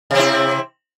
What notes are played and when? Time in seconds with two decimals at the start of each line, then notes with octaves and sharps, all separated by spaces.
0.11 C3
0.15 C4
0.19 E4